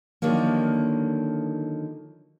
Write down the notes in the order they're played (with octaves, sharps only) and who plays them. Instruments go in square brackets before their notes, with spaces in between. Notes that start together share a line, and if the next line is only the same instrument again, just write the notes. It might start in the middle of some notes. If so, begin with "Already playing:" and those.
[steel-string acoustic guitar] D3 D#3 F3 F#3 A#3